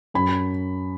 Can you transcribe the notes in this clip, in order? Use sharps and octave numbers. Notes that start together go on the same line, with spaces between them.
F#2 B5